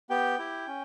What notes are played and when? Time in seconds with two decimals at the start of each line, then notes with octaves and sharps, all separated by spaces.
0.10 B3 G4 G5
0.39 E4 G4
0.67 C#4